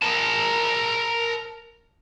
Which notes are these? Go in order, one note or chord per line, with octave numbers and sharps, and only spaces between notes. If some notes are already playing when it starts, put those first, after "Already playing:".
A#4 A5